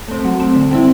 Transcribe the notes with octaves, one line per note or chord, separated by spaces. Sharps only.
A3 C4
F#3
A3 C4
D3
G3 C4 E4